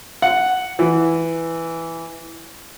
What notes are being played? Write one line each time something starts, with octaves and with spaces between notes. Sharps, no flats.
F#5
E3